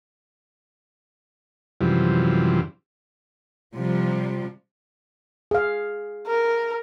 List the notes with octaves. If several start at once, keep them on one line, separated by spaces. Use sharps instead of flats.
F#2 C3 E3 F3 G3
C3 F3 G3
G#4 F5
A#4